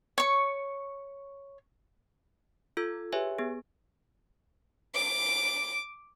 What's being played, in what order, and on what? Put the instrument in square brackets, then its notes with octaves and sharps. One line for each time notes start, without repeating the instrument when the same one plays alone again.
[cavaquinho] C#5 C#6
[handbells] F4 A4 E6 G#6
G4 G#4 B4 C#5 E5 G#5
B3 G#4
[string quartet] D6